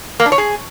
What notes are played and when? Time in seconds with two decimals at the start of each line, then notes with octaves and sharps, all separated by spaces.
0.20 A#3
0.26 D4
0.32 C#5
0.38 G#4